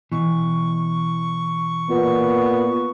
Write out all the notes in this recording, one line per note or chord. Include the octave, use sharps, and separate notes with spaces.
B2 E3 C#6
A#2 B3